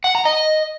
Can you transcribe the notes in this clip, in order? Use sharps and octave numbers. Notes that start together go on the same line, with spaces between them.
F#5
A#5
D#5